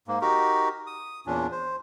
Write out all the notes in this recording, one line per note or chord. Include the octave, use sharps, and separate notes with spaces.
G#2 A#3
D#4 F#4 G4 A#4
D#6
E2 A#2 C#4 D4
C5